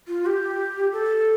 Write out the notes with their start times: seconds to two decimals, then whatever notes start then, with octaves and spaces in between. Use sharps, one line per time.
0.08 F4
0.26 G4
0.93 A4